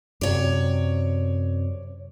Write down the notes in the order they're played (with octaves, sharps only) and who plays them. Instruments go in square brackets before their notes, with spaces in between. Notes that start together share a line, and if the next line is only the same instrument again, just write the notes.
[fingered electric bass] F#2 C3 [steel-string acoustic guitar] C#5 D5